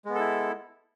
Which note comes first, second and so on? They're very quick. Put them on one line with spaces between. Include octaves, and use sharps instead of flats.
G#3 B3 A4 E4